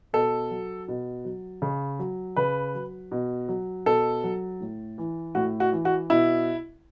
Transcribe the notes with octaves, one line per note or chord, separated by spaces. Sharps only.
B2 A4
F#3
B2
F#3
C#3
F#3
C#3 B4
F#3
B2
F#3
B2 A4
F#3
A2
E3
A2 F#4
F#4
E3
F#4
B2 E4